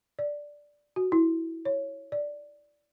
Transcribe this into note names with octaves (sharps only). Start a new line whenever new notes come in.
D5
F#4
E4
C#5
D5